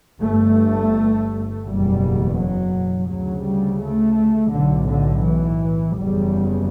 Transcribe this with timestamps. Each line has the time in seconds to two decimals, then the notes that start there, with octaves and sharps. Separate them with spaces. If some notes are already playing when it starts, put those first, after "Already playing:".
0.23 G1 G2 A3
1.66 F#1 E2 B2 G3
2.38 F#3
3.09 D2 C#3 F#3
3.46 G3
3.81 A3
4.52 B1 A2 D3
4.89 D3
5.24 E3
5.96 F#1 E2 C#3 G3